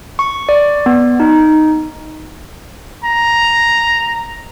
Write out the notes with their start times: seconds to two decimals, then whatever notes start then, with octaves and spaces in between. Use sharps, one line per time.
0.19 C#6
0.49 D5
0.86 B3
1.20 D#4
3.04 A#5